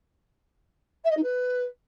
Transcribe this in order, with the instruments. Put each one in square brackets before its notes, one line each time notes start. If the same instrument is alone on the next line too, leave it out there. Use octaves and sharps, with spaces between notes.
[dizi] E5
D#5
D#4
B4